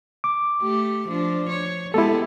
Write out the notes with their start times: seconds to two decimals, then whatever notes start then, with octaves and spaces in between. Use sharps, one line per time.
0.24 D6
0.62 A3 G4
1.08 F3 D4
1.49 C#5
1.94 G#3 B3 E4 G4 A4